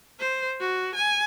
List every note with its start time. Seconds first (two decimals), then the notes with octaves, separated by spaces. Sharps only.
0.19 C5
0.60 F#4
0.95 G#5